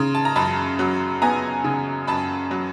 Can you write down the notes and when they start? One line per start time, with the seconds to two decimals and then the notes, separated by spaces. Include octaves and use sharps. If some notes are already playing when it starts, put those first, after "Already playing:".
Already playing: C#3 A#5 C6
0.15 A5
0.25 A#5
0.36 F#2 A5 B5
0.79 F#3
1.22 B3 G#5 A#5
1.64 C#3
2.07 F#2 A5 B5
2.51 F#3